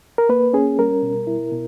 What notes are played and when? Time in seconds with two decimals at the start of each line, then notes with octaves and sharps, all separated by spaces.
0.18 A#4
0.29 A#3 B4
0.53 C#4 G#4
0.78 G3 A#4
1.02 B2
1.27 E4
1.52 B2